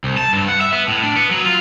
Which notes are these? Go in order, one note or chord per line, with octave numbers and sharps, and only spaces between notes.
C2
A5
G2
F#5
E5
B3
A2
D4
B3
F#3
F4